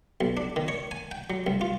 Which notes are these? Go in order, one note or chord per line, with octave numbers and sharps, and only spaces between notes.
B1
D4
D#3
C#5
G#5
G5
F#3
C2
F4